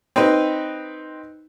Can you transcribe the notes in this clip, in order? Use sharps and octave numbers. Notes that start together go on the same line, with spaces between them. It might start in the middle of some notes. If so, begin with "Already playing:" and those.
C4 D#4 B4